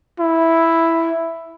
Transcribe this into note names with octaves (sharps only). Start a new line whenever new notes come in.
E4